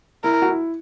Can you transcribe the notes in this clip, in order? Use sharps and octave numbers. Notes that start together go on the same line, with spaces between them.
E4 A#4
F#4
E4